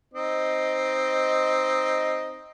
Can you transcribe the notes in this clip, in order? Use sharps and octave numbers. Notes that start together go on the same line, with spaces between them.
C4 D#4 D#5